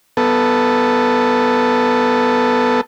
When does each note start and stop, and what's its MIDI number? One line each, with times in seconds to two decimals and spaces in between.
0.17 2.81 59
0.17 2.81 69